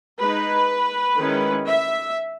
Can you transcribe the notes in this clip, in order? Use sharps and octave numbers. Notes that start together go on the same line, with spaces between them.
G#3 D#4 B4
D#3 G#3 C#4 E4
E5